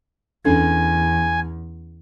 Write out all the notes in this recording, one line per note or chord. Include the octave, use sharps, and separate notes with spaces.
E2 C#4 D4 A4 G#5